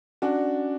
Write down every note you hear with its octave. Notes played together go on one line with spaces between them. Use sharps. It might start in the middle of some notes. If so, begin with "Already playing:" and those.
C#4 D4 F#4